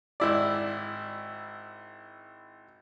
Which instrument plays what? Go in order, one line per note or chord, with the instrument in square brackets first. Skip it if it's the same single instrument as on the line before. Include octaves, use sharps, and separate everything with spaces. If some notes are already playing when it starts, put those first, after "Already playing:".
[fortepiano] G#1 E4 D5